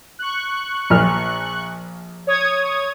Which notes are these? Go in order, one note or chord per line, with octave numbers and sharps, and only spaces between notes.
C#6 F#6
A#1 A#2 F6
C#5 D#6 G#6